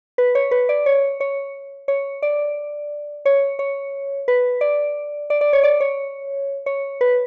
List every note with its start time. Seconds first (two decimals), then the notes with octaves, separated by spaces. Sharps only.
0.18 B4
0.35 C#5
0.51 B4
0.69 D5
0.86 C#5
1.20 C#5
1.88 C#5
2.22 D5
3.25 C#5
3.59 C#5
4.28 B4
4.61 D5
5.30 D5
5.41 D5
5.53 C#5
5.63 D5
5.80 C#5
6.66 C#5
7.01 B4